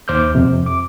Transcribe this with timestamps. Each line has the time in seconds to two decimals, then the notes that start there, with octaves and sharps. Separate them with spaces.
0.08 D#2 C5 D6 F6 G6
0.35 F2 C3
0.66 D6